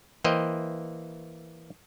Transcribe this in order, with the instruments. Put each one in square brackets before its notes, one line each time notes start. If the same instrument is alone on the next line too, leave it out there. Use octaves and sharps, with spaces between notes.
[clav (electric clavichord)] E3 A#3 C5 D#5 G5